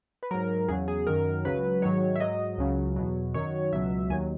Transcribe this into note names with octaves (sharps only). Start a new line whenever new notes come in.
B4
G#2 F#3 A#4
E2 C#3 F#3 G#4
G#4
F#2 D#3 F#3 A#4
C#2 C#3 F#3 B4
G#2 D#3 F#3 C#5
E5
G#2 F#3 D#5
C#2 C#3 F#3
E2 B2 F#3
F#2 D#3 F#3 C#5
C#2 B2 F#3 E5
D#2 D#3 F#3 G#5